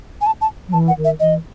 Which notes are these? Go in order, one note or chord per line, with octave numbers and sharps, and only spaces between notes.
G#5
A5
A5
F#3
E3 A5
F#5
D#3
E5
E3 D#5